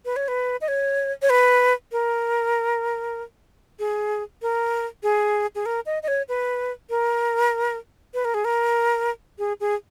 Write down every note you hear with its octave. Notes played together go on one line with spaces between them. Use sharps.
B4
C#5
B4
D#5
C#5
C#5
B4
A#4
G#4
A#4
G#4
G#4
A#4
D#5
D#5
C#5
B4
A#4
B4
A#4
G#4
A#4
G#4
G#4